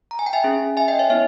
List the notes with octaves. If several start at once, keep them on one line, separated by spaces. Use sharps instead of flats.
A#5
G#5
G5
E5 G#5
C#4 G#4
E5 G#5
D#5 G5
C#5 E5
B3 E4 C#5 E5